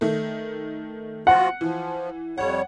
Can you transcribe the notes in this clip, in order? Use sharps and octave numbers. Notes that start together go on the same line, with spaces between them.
D#3 A3
F3 F4 F#4 F#5
E3 F3
F2 G3 C#5 F#5